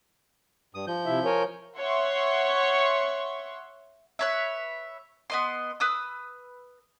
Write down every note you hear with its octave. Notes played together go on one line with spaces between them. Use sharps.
G2 D#6
F3 G6
C3 E4 E5
A#4 C#5 G#5
C#5 E5 F#5 C6 C#6
B4 C#5 E5
B3 D#5 C6
B4 D#6 E6